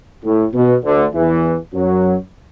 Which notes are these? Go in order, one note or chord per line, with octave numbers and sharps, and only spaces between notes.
A2
B2
D2 D3
E2 E3
F#2 F#3